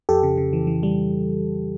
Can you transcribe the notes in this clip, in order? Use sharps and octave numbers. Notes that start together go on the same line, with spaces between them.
F2 G4 A4
C#3
C#3
E3
E3
G3